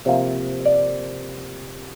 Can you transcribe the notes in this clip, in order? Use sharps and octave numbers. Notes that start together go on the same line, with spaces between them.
C3 F3 A#3 E5
D5